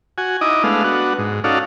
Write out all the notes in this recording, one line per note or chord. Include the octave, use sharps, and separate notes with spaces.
F#4 G#5
D#4 E4 D#5 D6
G#3 A3 B3 D4 F5
B3 D4 F#4
G#2
C#4 D#4 F#4 A4 D5 F5